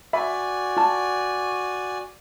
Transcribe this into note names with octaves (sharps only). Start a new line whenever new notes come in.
F#4 D5 E5 G#5 B5
F4 A5